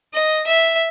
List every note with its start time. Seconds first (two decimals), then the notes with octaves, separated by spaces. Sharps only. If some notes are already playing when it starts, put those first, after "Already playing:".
0.14 D#5
0.47 E5